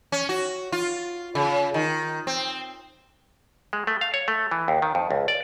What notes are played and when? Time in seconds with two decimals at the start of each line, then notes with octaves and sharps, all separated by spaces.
0.12 C#4
0.29 F#4
0.72 F4
1.35 C#3
1.74 D#3
2.27 C4
3.73 G#3
3.87 A3
4.01 F5
4.14 C#5
4.28 A3
4.51 E3
4.68 D#2
4.82 D#3
4.95 F2
5.11 C#2
5.28 D5